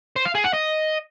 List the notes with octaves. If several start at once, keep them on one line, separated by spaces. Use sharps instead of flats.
C5
F5
G#4
F#5
D#5